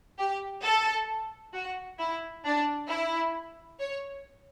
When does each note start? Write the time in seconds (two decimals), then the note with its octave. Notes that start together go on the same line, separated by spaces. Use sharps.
0.19 G4
0.64 A4
1.54 F#4
1.99 E4
2.45 D4
2.89 E4
3.80 C#5